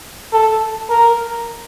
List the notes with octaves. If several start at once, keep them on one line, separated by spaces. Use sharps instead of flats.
A4
A#4